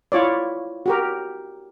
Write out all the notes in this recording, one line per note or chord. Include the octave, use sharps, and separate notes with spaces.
E4 F4 C#5 D5
F#4 G4 A#4